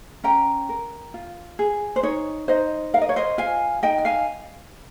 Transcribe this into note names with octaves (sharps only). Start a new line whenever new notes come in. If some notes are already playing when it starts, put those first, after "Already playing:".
C#4 G5 A#5
A#4
F4
G#4
C5
D#4 C#5
D#4 C5 D#5
A#4 F5
D#5
C#5
C5 D#5
F4 F5 G#5
D#4 D#5 G5
G5
F5 G#5